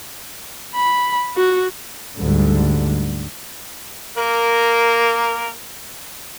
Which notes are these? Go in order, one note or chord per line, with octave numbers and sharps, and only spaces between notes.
B5
F#4
D2 G#2 D3 G3
A#3 A#4